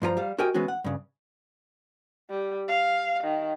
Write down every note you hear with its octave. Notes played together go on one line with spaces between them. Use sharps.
G2 F3 B4 A#5
G3 F5
F#4 G4 A#4 D#5 G5 G#5
E3 G#3 B3 C#4 F#4
F#5
G2 C#3
G3
F5
D#3